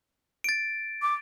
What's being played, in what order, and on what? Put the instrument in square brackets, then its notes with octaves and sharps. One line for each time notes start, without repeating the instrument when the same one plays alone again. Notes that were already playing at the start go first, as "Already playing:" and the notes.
[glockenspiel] A6 D7
[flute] D6